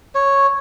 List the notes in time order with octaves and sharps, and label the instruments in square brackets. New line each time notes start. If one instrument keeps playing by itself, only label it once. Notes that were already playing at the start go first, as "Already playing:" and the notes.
[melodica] C#5